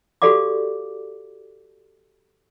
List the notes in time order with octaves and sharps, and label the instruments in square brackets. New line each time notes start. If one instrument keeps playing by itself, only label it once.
[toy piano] F#4 G4 A4 D5 F5 D6